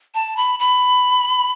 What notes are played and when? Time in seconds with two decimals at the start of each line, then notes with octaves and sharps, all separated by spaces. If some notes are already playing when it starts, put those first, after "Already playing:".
0.15 A5
0.37 B5
0.59 B5